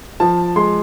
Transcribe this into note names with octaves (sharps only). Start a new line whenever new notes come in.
F3 A5
G#3 C6